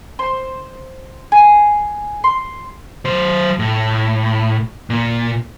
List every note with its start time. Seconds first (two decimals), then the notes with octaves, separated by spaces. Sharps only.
0.19 C5
1.32 G#4
2.24 C6
3.05 F#3 C5
3.59 A2
4.90 A#2